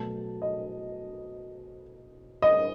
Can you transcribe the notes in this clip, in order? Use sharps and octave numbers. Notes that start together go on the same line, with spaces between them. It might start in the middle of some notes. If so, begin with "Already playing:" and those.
Already playing: B2 F#3 A3 A5
D#5
D#5